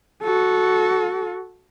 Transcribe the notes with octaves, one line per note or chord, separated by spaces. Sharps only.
F#4 A4